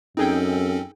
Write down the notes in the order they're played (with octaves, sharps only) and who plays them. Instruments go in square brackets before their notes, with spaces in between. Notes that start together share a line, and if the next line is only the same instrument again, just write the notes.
[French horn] F#2 [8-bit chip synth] C4 C#4 A4 [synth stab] D#4 G#4 G5